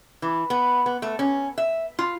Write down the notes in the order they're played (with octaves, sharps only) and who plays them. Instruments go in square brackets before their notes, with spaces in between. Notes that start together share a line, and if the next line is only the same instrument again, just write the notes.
[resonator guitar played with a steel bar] E3
B3
B3
A3
C#4
E5
F4